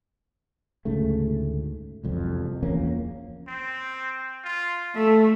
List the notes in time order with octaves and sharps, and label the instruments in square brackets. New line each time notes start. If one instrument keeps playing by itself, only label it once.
[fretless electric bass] D2 G#2 C#3 A3
E1 C2 F2
E2 F3 A#3 C#4
[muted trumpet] C4
F4
[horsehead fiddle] A3 [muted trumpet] E5